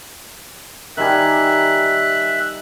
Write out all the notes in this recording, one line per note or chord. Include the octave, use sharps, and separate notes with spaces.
D#3 G3 E5 G#5 F#6